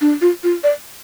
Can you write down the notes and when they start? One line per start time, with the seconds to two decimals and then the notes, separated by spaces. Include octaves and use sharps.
0.01 D4
0.21 F4
0.44 F4
0.64 D5